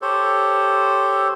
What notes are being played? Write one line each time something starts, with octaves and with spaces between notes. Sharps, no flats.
G4 A4 C5 C#5